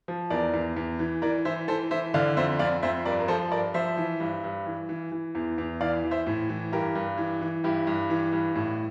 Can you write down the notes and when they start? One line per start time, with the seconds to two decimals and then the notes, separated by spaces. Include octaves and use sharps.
0.08 F3
0.30 E2 A#4 D5
0.54 E2
0.76 E2
0.99 E3
1.22 E3 A#4 D5
1.45 E3 C5 E5
1.68 E3 A4 C5
1.91 E3 C5 E5
2.14 D3 D5 F5
2.37 F2 C5 E5
2.59 F2 D5 F5
2.82 F2 C5 E5
3.05 G2 A#4 D5
3.20 A#4
3.28 F3 A4 C5
3.51 G2 A#4 D5
3.74 F3 C5 E5
3.97 E3
4.20 G2
4.44 G2
4.66 E3
4.89 E3
5.12 E3
5.35 E2
5.58 E2
5.81 E3 D5 F5
6.04 E3
6.11 C5 E5
6.27 A2
6.49 E3
6.72 G2 G4 A#4
6.95 G2
7.18 E3
7.41 E3
7.64 G2 E4 G4
7.87 G2
8.10 E3
8.33 G2
8.56 A2